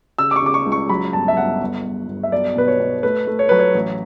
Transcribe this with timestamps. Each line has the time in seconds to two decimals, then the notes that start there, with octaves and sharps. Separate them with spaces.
0.19 C#3 E6
0.31 D6
0.36 C#6
0.42 C#3 D6
0.54 C#6
0.66 C#2
0.72 C#6
0.89 F#3 B5
1.13 G1 A5
1.28 E5
1.37 G1 F#5
1.61 G1
1.85 G1
2.08 G1
2.23 E5
2.32 B1 D5
2.56 B2 B4
2.68 C#5
2.80 B2
3.03 A3 B4
3.27 A3
3.39 C#5
3.49 F#3 B4
3.59 C#5
3.74 A1